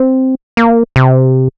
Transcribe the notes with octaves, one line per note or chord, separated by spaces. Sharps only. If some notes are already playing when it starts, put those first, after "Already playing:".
Already playing: C4
A#3
C3